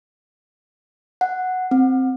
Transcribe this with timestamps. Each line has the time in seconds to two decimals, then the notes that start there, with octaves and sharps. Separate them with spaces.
1.21 F#5
1.71 C4